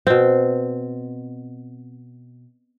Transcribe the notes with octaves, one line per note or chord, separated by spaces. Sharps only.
B2 C4